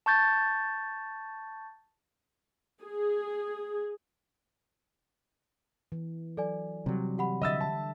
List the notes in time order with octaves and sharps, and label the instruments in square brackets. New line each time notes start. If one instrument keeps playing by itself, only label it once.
[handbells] A5 C#6 G6 A6
[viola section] G#4
[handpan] E3
[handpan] F#3 [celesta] A4 D5 G#5
[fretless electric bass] C3 F#3 [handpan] G3
[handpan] E3 [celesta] G4 F#5 B5
[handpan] D3 E5 [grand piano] D#5 E6 A6
[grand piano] A5